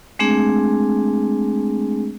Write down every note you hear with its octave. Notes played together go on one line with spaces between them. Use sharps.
G#3 A3 C4 D4 G#4